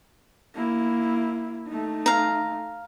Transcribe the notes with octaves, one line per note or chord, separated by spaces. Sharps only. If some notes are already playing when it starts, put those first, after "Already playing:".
A#3 E4
A3 D#4
F5 A#5